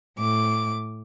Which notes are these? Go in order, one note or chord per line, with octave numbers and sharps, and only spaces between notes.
A2 D6